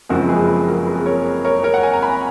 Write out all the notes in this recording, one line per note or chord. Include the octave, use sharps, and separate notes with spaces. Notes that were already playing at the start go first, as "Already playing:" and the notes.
F#1 F2 C#3 F3 G#3 F#4 A#4
G#4 B4
G#4 B4
F#4 A#4
G#4 B4
A#4 C#5
A#4 C#5
A#4 C#5
F#5
G#5
A#5
G#5 B5